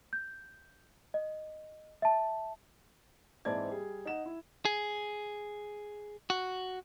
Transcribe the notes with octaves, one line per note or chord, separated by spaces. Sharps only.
G6
D#5
E5 A5
G#2 E3 C4 D5 A5 G#6
G3 G#4
D#4 F#5 E7
E4
G#4
F#4